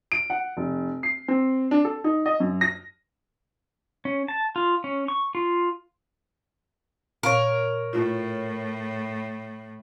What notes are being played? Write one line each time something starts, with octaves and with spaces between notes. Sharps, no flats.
D7
F#5
F1
C7
C4
D4
A4
D#4
D#5
F#2
A#6
C#4
A5
F4
C#4
C#6
F4
A#2 A#4 C#5 F5 C#6
A2 E4 F4